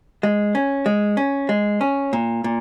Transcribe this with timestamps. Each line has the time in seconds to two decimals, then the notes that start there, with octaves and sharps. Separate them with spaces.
0.23 G#3
0.55 C#4
0.86 G#3
1.17 C#4
1.49 G#3
1.81 C#4
2.13 A#2
2.44 A#2